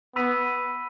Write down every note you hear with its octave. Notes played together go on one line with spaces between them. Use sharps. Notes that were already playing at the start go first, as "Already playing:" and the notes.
B3 B5 E6 B6 D#7